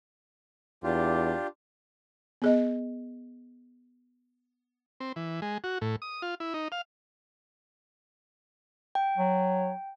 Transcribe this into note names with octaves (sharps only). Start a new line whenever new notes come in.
E2 D4 F4 G4
B3 G#4 D#5
C4
E3
G#3
F#4
A2
D#6
F4
E4
D#4
F5
G5
F#3